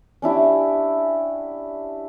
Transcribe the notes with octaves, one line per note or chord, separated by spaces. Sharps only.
C#4 D4 E4 G4